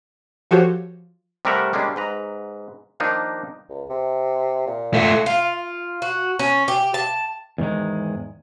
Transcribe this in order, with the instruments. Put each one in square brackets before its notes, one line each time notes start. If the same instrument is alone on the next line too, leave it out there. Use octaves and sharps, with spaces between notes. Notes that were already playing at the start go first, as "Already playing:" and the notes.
[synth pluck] F3 F#4 G4 A4 C5 C#5
[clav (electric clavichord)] C3 G3 A3 A#4 E5 F#5
G3 G#3 A#3 C#4 D4
G#2 B4 A#5
D#3 F3 A#3 D4 D#4
[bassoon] C#2
C3
A#2
[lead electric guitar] A3 F4
[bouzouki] F4
F#4
C#4
G4
A5
[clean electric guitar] E2 G#2 D#3 G#3